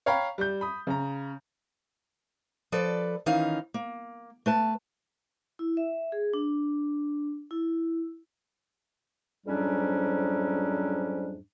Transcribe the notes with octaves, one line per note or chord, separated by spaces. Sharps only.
C#5 F5 G5 A#5 B5
G3 G6
B5 D#6
C#3 A#5
F3 A4 B4 D5
D#3 E3 C#4 D#4 F5
A#3
A3 B4 A5
E4
E5
G#4
D4
E4
F2 G#2 F#3 G3 C#4 D4